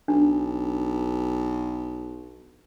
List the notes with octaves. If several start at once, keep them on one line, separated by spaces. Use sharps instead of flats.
B1 D4